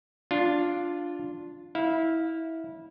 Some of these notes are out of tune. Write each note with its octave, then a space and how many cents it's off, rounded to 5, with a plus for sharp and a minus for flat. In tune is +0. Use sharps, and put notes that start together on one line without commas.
D4 +0 F4 +0
E4 -20 F5 +0